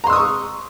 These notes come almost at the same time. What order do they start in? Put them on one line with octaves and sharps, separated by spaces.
A#5 C6 E6 D#6 C#6